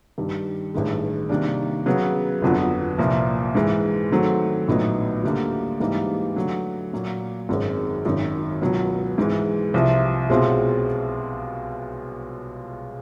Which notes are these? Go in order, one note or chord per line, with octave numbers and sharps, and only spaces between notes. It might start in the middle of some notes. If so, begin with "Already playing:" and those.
G2 D#3 G3
A1 G2 D#3 G#3
C3 D#3 G3 A#3 D4
C#3 F#3 B3
G1 F2 D3 F#3 B3
C2 A#2 F3 A#3
G#2 E3 G#3
D#3 F#3 A3 C4
A#1 A2 F#3 B3 D#4
D2 D3 G3 A#3
G#2 E3 G3 A#3 D#4
D3 F#3 A3
A#2 F#3 A#3
G#1 F#2 D#3 G#3 C4
G#1 F#2 D#3
C#2 B2 F#3
G#2 E3 G#3
C2 C3 F3
B1 B2 G#3 C4 F4